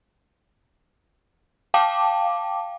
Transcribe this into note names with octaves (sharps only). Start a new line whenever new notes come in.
F5 G5 A5 D6